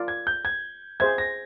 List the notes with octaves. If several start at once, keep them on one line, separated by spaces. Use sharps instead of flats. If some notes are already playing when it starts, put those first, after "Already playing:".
Already playing: F4 A#4 D5 F5
G#6
G6
G#6
G#4 C5 E5 G#6
A#6